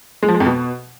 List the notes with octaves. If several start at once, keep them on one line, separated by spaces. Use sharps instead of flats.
G#3
F3
G#3
F2
B2